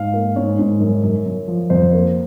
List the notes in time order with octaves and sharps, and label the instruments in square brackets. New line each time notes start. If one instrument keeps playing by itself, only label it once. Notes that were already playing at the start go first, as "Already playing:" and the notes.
Already playing: [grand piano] G#2 F5
A#3
G#2 C#5
G#2
F#2
F#2
F#2
F3
F2 C5
A#3